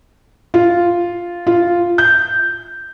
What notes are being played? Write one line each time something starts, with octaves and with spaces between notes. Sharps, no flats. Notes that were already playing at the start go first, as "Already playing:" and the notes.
F4
F4
G6